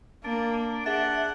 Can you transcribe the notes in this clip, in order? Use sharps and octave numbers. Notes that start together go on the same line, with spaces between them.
A#3 D4
D4 G#4 E5 F#5